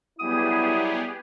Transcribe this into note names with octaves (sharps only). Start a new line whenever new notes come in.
F#3 G3 B3 E4 G4 G#4 D#6